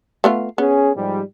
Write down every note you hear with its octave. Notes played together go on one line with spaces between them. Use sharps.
A3 B3 F4
B3 C#4 G#4
G#2 F3 G3